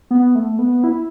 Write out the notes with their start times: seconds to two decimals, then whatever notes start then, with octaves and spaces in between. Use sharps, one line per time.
0.11 B3
0.35 A3
0.59 B3
0.84 E4